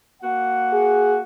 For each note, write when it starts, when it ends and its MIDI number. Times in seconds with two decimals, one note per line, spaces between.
0.22 1.24 58
0.22 1.24 66
0.22 1.24 78
0.73 1.17 68